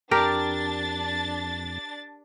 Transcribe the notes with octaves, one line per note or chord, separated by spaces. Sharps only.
F2 D4 G4 A#4 A6